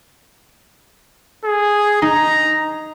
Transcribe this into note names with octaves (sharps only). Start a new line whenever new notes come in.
G#4
D#4 A#5